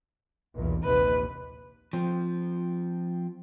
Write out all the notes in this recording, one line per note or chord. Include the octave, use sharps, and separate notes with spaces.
B1 E2 A#2
A#1 D#2 C3 B4
F3 C4